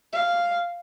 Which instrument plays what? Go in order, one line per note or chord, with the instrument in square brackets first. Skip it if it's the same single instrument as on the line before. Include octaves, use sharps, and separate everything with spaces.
[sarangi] F5